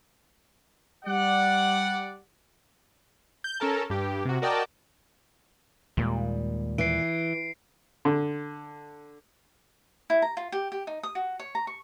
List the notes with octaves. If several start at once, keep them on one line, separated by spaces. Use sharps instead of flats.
G3 D5 F#5
G6
C#4 A4 A#4 A5
G2 G4
C3 F#4
F#4 A#4 D5 D#5 G5 A5
D#2 A#2 G3 G#3
E3 C7 D7
D3
E4
A#5
F4
G4
G4
D#4
D#6
F#4
C#5
A#5
C#6